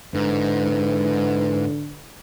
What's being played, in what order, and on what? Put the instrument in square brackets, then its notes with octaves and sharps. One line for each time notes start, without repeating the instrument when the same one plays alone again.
[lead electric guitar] G#2 [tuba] D3 [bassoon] E3